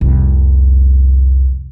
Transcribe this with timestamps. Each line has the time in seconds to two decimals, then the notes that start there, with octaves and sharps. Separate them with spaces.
0.01 C2 F2